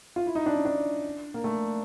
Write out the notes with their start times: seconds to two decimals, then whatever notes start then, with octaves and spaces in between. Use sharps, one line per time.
0.16 F4
0.26 E4
0.35 D#4
0.46 D4
0.55 C#4
0.65 D4
1.34 A#3
1.44 A3